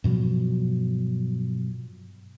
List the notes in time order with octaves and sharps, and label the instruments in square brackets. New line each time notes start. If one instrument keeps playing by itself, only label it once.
[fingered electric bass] G2 B2 F3 F#3